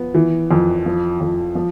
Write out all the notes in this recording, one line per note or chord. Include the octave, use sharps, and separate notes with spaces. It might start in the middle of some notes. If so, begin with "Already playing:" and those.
Already playing: F3 B3
E3
F2
F3
F2
F3